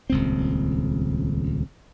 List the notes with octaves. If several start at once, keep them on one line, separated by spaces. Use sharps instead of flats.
D#1 C#2 C4